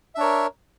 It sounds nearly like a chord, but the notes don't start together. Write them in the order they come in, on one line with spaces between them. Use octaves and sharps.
E5 D4 C#5 A#4